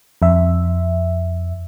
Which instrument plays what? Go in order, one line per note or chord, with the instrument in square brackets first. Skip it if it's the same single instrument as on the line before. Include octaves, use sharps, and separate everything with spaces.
[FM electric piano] F2 E5